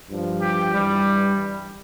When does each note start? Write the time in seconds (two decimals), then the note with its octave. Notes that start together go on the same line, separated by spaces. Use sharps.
0.10 G2 F3
0.41 G4
0.73 G2 E3 G3